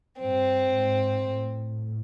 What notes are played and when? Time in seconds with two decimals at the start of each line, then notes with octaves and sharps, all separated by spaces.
0.21 G2 C4
0.74 G#2
1.27 A2